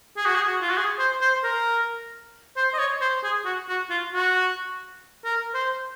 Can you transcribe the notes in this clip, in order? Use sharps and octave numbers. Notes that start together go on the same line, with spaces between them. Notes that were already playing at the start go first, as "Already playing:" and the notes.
G#4
F#4
G#4
F#4
F4
F#4
G#4
C5
C5
A#4
C5
D#5
C#5
C5
G#4
F#4
F#4
F4
F#4
A#4
C5